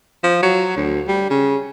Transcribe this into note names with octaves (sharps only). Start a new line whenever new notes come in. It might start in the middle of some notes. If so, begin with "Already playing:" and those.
F3
F#3
D2
G3
C#3